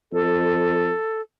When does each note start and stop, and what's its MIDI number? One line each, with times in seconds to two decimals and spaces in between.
0.12 0.91 41
0.12 1.21 69